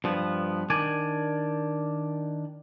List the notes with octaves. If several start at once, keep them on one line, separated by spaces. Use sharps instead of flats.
G2 F3 B3
D#3 D4 D5 G#5